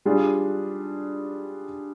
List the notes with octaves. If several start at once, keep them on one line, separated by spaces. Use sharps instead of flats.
G3 D4 F4 G#4